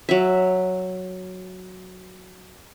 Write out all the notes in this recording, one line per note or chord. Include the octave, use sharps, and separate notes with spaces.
F#3 E5